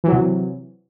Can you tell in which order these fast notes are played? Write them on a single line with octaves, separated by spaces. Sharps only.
E3 F#3 C3